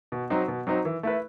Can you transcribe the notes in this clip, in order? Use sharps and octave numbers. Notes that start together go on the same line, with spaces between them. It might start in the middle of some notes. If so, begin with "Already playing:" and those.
B2
F#3 C4 D#4
B2
F#3 C4 D#4
E3
A3 E4 B4